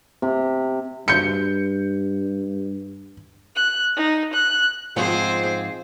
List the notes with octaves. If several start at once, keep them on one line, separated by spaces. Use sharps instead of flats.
C3
G2 G6 C#7
F#6
D#4
F#6
G#2 F3 C4 F4 G#4 C5